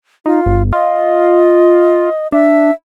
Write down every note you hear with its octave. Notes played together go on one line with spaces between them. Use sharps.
D#4 F4
G1
F4 D#5
D4 E5